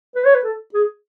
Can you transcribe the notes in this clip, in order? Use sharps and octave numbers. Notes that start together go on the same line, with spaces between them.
B4
C#5
B4
A4
G#4